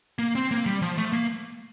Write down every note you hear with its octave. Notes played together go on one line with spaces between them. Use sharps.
A#3
C4
A#3
G3
F3
A3
A#3